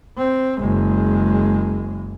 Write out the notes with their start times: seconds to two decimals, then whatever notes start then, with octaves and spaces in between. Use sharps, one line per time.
0.18 C4
0.60 F#1 G#3